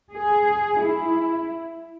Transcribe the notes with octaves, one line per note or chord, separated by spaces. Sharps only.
G#4
E4